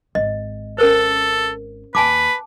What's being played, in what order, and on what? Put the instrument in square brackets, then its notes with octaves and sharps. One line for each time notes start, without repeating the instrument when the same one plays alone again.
[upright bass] G#1 [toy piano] D#5
[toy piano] C#4 A#4 C5 [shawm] A4
[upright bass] D#2 [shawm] B4 [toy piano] G#5 A5 D6